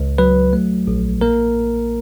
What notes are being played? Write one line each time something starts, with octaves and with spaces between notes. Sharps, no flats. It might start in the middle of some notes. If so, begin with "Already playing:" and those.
Already playing: C#2
F#3 B4
A3
A#1
A#3 A#4